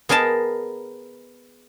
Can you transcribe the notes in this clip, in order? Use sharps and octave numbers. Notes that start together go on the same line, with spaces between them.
B3 G#4 A#4 D#5 A5